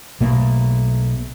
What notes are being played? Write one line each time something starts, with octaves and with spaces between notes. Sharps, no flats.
B1 B2 A3 A#3